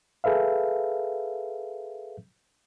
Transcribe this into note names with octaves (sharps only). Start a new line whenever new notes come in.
G#4 A4 B4 E5 F5